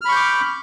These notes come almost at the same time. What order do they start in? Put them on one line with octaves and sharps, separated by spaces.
F6 B5 C#6 G6 D6